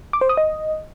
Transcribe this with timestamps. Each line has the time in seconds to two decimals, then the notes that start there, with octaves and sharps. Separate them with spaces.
0.13 D6
0.21 C5
0.29 D#6
0.37 D#5